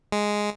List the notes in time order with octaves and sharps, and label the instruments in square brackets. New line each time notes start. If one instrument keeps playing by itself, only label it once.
[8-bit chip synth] G#3